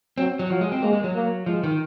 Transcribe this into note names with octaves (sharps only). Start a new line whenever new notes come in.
F#3 C4
F#3
F3 F#3
G#3
C4
G#3 A#3
G#3
F#3
A#3
F3 G#3
D#3